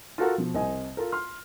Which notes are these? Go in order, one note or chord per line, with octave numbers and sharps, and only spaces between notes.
F4 F#4 A4 A#4
B2 F3
C2 C4 D#5 G#5
F4 A4 A#4
C6 F6